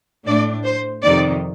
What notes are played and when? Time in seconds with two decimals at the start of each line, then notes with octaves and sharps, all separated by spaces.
0.26 A2 A3 D4 D5
0.64 C5
1.03 F2 C3 D#3 D5